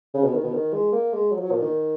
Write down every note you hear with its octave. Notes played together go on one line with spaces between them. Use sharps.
C#3
B2
D#3
B2
D#3
G#3
A#3
G#3
F#3
F3
F#3
A#2
D#3